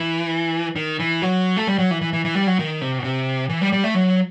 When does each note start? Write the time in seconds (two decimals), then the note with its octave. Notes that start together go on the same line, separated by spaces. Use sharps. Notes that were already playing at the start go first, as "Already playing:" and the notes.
Already playing: E3
0.76 D#3
1.00 E3
1.22 F#3
1.57 A3
1.67 G3
1.78 F#3
1.91 E3
2.01 E3
2.13 E3
2.25 E3
2.35 G3
2.47 F#3
2.59 D#3
2.81 C3
2.98 B2
3.04 C3
3.49 E3
3.61 G3
3.73 G3
3.84 A3
3.95 F#3